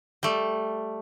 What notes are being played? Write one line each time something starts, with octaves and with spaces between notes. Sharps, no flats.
G3 A3